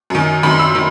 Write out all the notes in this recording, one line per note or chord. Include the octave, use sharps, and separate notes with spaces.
F#2 D#3
F#2 D#3 B5
C6
E6
D#3